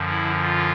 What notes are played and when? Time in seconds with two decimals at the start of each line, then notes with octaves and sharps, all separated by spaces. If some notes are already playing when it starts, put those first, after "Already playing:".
Already playing: F#2 D3 F3
0.10 E4
0.41 F4